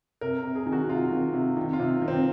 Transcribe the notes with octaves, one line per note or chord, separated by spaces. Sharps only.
C3 A#4
C3
G#4
D#3
F#4
C3 F4
D#3
C3
D#3
F4
C3
D#3
C4